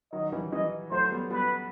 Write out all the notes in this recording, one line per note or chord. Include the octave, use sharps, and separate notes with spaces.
D#3 F#3 D#5
E3 G3
E3 G3 D#5
F#3 A3 C5
G3 B3
G3 B3 B4